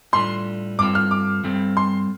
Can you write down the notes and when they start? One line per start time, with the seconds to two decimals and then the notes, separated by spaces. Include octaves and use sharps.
0.13 A2 G3 D4 F4 A4 C6
0.79 G2 G3 C4 F4 A4 D6
0.95 F6
1.11 D6
1.43 G2 G3 C4 A4
1.77 C6